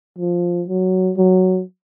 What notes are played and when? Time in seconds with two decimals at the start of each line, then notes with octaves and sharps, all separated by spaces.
0.19 F3
0.68 F#3
1.17 F#3